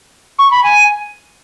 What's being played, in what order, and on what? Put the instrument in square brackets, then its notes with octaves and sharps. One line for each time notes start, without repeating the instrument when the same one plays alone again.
[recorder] C#6
B5
G#5